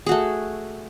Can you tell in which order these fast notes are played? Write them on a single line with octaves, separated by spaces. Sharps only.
G#4 F#4 A3